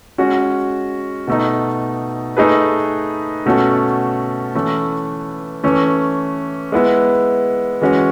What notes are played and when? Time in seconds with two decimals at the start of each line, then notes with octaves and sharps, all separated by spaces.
0.18 G#3 C#4 F#4
1.27 B2 A3 D#4
2.37 A3 D#4 G#4 B4
3.46 B2 A3 C#4 F#4 A4
4.55 E3 A3 C#4 E4 B4
5.64 E3 A3 C#4
6.72 G#3 B3 E4
7.81 E3 G#3 C#4 F#4